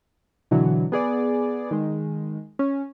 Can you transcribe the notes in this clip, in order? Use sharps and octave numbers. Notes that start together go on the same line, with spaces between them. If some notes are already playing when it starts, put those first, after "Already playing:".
B2 D3 E3 F#3
B3 G#4 D5
D#3 G#3
C#4